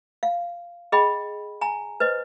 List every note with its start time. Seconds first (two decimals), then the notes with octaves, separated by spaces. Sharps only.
0.23 F5
0.92 G#4 D#5 G5 B5
1.61 G#5 A#5
2.00 B4 C5 D#5